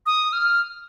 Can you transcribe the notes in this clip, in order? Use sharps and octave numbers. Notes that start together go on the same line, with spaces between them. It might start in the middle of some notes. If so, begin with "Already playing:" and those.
D#6
F6